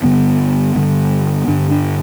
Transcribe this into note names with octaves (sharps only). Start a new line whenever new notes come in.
G2 D3 B3
G2 D3
G2 D3 D4
D4